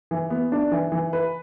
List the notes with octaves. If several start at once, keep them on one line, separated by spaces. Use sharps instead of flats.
E3
B3
D4
E3
E3
B4